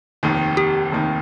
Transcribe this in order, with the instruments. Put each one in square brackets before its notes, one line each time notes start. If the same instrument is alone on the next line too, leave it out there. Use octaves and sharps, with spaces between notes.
[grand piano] F1 D#2 D#3
[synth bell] G4
[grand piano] F1 D#2 D#3